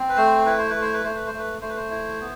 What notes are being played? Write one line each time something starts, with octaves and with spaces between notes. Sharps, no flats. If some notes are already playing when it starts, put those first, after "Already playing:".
Already playing: C4
B4
A3 C5
E4 B4
C5
A3 B4
C5
B4
A3 C5
B4
C5
A3
B4
A3 C5
B4
C5
E4
B3